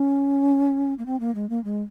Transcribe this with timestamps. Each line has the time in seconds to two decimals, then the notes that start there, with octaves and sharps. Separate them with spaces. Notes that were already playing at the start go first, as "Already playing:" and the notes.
Already playing: C#4
0.99 A#3
1.06 C4
1.20 A#3
1.35 G#3
1.50 A#3
1.64 G#3